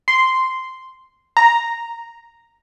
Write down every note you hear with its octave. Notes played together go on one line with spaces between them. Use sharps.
C6
A#5